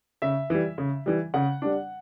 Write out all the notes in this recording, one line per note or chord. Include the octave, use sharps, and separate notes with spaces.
C#3 E5
E3 G3
C#3
E3 G3
C#3 F#5
G3 D4